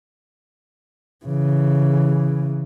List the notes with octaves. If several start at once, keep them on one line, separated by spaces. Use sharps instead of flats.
C#3 E3